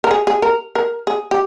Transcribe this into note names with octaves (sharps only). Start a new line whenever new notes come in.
A#4
G#4
G#4
A#4
A#4
G#4
G4